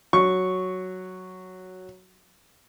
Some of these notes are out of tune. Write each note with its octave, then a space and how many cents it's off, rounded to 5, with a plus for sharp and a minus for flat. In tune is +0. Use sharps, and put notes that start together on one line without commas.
F#3 +0 C#6 +0